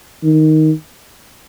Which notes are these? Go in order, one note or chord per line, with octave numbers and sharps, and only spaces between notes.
D#3